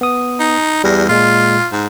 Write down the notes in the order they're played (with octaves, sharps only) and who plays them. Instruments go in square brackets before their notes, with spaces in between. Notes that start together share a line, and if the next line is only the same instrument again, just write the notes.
[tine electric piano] B3 D#6
[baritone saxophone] D#4
[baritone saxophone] E2 [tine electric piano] G3 A#6
[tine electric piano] A#2 G#3 [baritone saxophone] F4
[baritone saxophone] G#2